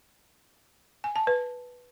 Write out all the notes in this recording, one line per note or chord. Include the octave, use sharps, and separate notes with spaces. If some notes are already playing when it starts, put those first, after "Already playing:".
G#5
A5
B4